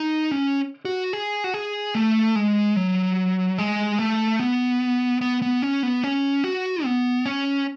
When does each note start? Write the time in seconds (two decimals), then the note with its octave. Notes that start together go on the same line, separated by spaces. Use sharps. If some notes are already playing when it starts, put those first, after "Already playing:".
Already playing: D#4
0.31 C#4
0.85 F#4
1.13 G#4
1.44 F#4
1.54 G#4
1.95 A3
2.36 G#3
2.76 F#3
3.58 G#3
3.99 A3
4.40 B3
5.21 B3
5.42 B3
5.62 C#4
5.83 B3
6.04 C#4
6.44 F#4
6.84 B3
7.25 C#4